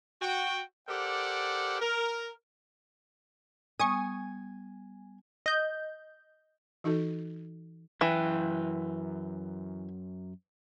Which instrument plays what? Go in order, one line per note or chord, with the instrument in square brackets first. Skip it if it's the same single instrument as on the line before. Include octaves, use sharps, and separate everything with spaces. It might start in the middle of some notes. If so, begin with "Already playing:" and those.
[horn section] F#4 G5
G4 A4 A#4 C5 D5 F#5
A#4
[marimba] G3 B3 [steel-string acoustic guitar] G#5 [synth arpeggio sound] C#6 D#6
[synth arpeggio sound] D#5 G6
[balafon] E3 D#4 F#4 A4
[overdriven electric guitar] F#2 G5 [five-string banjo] E3